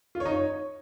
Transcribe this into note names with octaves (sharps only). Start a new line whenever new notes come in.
F4
C#5
D#4
C#5